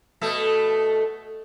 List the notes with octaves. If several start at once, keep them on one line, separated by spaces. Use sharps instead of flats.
B2 A3 A4